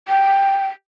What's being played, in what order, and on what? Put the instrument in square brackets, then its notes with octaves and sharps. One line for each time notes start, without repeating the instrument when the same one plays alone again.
[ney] G5